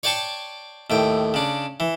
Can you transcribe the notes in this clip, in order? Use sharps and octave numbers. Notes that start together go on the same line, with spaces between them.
C#5 D5 G5 A5 C6 C#6
D#2 A2 G5
C#3 D4
E3